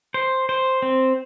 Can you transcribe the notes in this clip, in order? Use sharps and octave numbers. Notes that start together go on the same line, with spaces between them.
C5
C5
C4